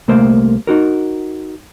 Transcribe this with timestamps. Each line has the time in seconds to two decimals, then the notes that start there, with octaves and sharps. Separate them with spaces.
0.08 C2 A3 A#3 C5
0.67 D#4 F#4 A#4